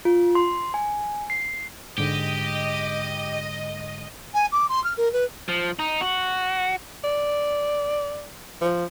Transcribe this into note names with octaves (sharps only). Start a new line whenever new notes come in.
F4
C6
G#5
C7
G#2 D3 G#3 G4 D#5
G#5
D6
C6
F6
A#4
B4
F3
D#4
F#4
D5
F3